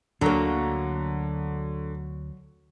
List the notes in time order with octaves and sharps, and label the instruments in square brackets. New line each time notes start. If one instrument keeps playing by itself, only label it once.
[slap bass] D2 [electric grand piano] D3 A#5 [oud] F#3 A#3